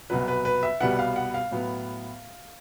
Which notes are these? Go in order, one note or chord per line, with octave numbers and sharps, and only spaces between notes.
C2 B2 F#3 B4
B4
B4
E5
C2 B2 G3 B3 F#5
F5
F#5
F5
A2 F#3 B3